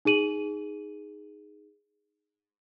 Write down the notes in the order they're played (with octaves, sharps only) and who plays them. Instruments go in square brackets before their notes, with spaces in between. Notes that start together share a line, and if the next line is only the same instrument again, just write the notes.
[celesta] D#4 G#4 D#7 F#7